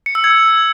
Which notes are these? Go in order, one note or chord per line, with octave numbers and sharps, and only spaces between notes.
C#7
E6
G#6